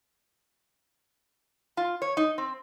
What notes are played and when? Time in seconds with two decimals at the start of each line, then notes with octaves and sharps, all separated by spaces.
1.77 F4
2.02 C#5
2.17 D#4
2.38 C4